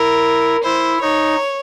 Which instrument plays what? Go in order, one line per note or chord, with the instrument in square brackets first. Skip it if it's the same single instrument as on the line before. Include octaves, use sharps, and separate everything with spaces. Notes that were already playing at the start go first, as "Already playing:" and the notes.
Already playing: [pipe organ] E4 [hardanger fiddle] A#4
[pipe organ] E4 [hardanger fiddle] C5
[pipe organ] D#4 [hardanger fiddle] C#5